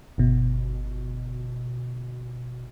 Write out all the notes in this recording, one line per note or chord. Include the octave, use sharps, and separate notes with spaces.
G1 B2